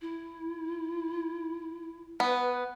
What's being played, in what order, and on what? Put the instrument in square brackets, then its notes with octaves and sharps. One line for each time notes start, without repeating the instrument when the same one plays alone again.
[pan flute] E4
[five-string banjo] B3 [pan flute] B4